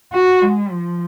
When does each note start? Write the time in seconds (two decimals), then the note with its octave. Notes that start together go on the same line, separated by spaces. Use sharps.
0.13 F#4
0.42 G#3
0.70 F3